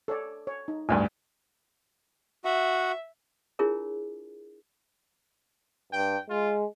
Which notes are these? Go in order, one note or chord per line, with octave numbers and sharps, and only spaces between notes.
A4 C#5 D5
C#5
D#4
A1 D2 G2 G#5
F#4 E5 F#5
D4 E4 F4 G#4 A#4 C#5
G2 G5
G#3 F4